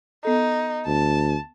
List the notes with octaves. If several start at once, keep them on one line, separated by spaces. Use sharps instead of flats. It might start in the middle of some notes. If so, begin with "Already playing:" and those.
B3 D#4 A4
D2 A5